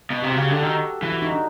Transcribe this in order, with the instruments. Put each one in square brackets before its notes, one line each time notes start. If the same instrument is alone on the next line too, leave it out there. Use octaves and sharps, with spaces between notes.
[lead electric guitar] B2
[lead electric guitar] C3 [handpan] G4
[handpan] F#4
[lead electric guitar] C#3
[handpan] G4
[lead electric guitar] D3 [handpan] A4
[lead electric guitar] D#3 [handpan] F#4
[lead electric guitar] E3 [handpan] F#4
[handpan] F#4
D#4
D4